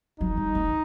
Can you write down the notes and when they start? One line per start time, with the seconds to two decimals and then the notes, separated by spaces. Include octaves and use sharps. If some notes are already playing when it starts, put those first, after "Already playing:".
0.20 F#3 D#4
0.37 G3
0.55 A3